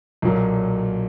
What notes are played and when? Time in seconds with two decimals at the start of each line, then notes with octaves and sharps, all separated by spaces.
0.22 B1 A#2 F#3 A#3